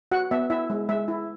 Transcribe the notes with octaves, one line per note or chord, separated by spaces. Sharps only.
F#4 F#5
B3 E5
E4 E5
G#3
G#3 E5
E4